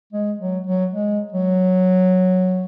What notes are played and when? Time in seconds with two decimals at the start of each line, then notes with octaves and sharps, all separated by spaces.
0.13 G#3
0.40 F#3
0.67 F#3
0.92 G#3
1.33 F#3